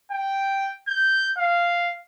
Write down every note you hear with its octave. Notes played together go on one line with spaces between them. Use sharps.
G5
G6
F5